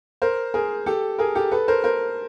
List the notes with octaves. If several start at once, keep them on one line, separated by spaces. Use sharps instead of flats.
A#4 C5
G#4 A#4
G4 A4
G#4 A#4
G4 A4
A4 B4
A#4 C5
A#4 C5